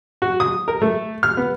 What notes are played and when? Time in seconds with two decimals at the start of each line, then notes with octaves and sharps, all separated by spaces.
0.22 F#4
0.40 D#6
0.68 A#4
0.82 A3
1.23 F6
1.37 B3